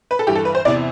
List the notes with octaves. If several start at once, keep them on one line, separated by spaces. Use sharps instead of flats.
B4
A4
G2 E3 G4
A4
B4
C5
E2 C3 E3 D5